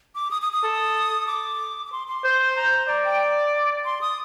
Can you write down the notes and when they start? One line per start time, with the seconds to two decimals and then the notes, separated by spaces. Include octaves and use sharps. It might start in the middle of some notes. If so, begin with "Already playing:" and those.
0.15 D6
0.31 D#6
0.42 D#6
0.53 D#6
0.63 A4
1.27 D6
1.86 D6
1.92 C6
2.08 C6
2.24 C5
2.56 A#5
2.88 D5 A#5
3.05 G5
3.85 C6
4.01 D#6